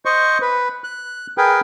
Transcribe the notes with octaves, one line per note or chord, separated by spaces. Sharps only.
C5 D#5 C#6
B4
F#6
G#4 A#4 B4 G5